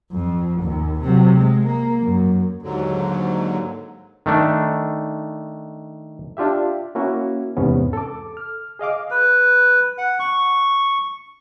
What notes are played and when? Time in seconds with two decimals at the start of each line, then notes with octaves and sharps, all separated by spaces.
0.12 F2
0.62 D#2
1.02 C3 F#3
1.35 G#3
1.66 A#3
2.01 F#2
2.62 D#2 G#2 D3 F#3
4.26 D#3 A3 D4
6.37 D4 F4 G4 E5
6.95 A#3 C#4 E4 F#4
7.56 E2 G#2 C3 B3 C#4
7.93 A4 D6
8.37 F6
8.79 G#4 D#5 F5 D6
9.11 B4
9.98 F#5
10.20 C#6